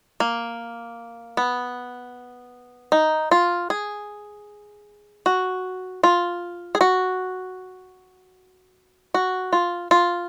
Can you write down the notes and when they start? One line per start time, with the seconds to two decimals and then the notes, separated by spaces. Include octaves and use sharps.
0.20 A#3
1.37 B3
2.92 D#4
3.31 F4
3.70 G#4
5.26 F#4
6.03 F4
6.75 G#4
6.81 F#4
9.14 F#4
9.53 F4
9.91 F4